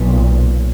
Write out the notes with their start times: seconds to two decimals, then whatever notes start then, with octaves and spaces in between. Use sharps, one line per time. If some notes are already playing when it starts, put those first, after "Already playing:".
Already playing: B1 A#2